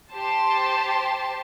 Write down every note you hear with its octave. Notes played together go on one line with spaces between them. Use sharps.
G4 C5 A5 C6